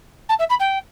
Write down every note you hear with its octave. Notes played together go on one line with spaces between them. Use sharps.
A5
E5
B5
G5